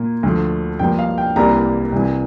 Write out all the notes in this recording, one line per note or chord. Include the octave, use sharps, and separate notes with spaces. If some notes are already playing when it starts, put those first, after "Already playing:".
Already playing: A#2 A#3
D2 D3 F3 A3
G2 F3 A#3 G5
F5
G5
C2 C3 E3 G3 A#3 A#5
C2 C3 E3